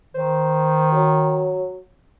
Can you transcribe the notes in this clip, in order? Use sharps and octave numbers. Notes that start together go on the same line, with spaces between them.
D#3 C5
F#3